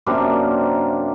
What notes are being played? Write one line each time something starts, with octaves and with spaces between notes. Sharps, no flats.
F#2 C3 A#3 D4